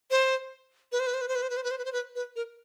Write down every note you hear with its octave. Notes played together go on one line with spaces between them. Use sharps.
C5
B4
C5
B4
C5
B4
C5
B4
C5
B4
C5
B4
C5
B4
C5
B4
B4
A#4